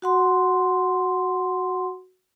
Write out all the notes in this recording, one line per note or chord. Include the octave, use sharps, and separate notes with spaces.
F#4 F#5 C6